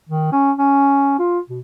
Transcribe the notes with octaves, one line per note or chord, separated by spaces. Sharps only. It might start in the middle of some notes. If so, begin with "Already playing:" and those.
D#3
C#4
C#4
F4
B2